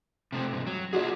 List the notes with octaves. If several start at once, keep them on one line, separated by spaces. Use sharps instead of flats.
C3 A3 C4
G2 C3
F#3
F4 F#4 G#4 D5